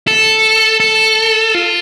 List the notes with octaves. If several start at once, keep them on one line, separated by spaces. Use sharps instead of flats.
A4
A4
F4